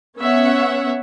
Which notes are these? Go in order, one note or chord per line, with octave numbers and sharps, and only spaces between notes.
B3 C#4 C#5 E5 F#5